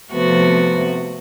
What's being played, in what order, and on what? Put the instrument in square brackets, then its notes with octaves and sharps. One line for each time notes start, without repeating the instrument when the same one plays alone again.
[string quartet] C3 F3 A3 B3 C4 F#4